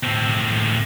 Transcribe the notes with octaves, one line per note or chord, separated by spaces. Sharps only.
A2 C4